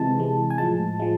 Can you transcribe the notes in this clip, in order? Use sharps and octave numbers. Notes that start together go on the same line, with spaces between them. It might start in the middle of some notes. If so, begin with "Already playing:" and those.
Already playing: C3 E3 G#3 A5
C3 E3 G#3
G#5
A2 F3 G#3 A5
F3 G#3